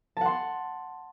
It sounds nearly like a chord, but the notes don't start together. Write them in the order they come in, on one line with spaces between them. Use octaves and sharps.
A5 F#5 C6